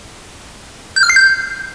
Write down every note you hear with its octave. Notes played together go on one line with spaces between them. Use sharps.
G6
F6
C7
G6